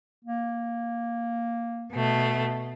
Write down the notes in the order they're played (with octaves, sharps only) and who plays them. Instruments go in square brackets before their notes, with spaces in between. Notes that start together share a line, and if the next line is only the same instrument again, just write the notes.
[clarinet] A#3
[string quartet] B2 A3